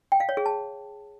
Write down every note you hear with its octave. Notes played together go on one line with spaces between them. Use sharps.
G5
F5
C#5
G#4
A5